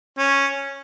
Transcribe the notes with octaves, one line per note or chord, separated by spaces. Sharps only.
C#4